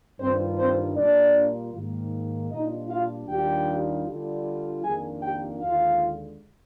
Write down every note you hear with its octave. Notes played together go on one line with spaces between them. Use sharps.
G2 D#3 G3 C4 D4 F4 C5
C4 C5
A#2 G3 A#3 D4 F4 D5
G#2 D#3 A#3
A#2 G3 D4 D#4 F4 D#5
F4 F5
D#2 D#3 G3 D4 F4 G4 G5
D3 G3 D4 F4
F2 D#3 A#3 D4 F4 G#4 G#5
G4 G5
D#2 D3 G#3 F4 F5